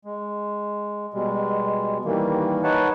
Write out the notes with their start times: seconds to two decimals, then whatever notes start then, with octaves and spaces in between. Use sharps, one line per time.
0.05 G#3
1.14 B2 G3 G#3
2.05 D#3 E3 G3 A#3
2.63 D#4 B4 C#5 F#5 A5